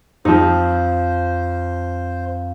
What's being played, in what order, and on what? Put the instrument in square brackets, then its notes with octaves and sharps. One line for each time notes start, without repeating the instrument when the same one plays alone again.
[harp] F2 [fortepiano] F3 C4 D#4 [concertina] C5